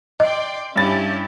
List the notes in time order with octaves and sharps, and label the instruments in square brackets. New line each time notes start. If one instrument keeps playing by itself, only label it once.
[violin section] D5 G5 C6 [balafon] D#5
[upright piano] G2 A6 [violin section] C#4 E4 G4